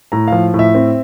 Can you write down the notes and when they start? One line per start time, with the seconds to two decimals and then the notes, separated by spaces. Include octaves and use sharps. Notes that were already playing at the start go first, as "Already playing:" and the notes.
0.12 A2 A#5
0.28 F3 F5
0.54 A2
0.59 E5
0.75 C4